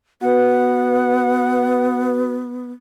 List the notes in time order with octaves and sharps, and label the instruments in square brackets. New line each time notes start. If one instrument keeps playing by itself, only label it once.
[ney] B3 [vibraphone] F#4 B4 [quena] F#5